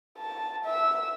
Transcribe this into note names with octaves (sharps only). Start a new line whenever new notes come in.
A5
E5 E6